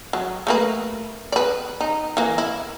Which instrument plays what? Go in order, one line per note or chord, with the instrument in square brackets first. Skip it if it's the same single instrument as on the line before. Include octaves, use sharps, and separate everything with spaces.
[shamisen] F#3
A3 A#3 B4
B4 D5
D#4
E3 A#3
E4